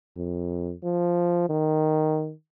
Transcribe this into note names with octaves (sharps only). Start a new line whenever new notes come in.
F2
F3
D#3